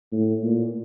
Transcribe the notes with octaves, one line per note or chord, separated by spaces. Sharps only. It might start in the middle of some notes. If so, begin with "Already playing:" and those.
A2
A#2